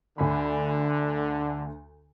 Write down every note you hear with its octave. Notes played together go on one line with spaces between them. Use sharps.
D2 D3 G#5 B5